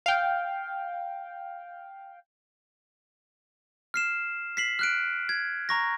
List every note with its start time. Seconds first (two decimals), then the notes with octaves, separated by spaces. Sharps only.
0.06 F5 G5
3.94 F6 C7 E7
4.57 B6 C7 F#7
4.79 F6 F#6 D7
5.29 G#6
5.69 A#5 C#6 A#6